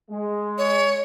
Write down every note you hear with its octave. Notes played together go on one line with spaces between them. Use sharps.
G#3
C#5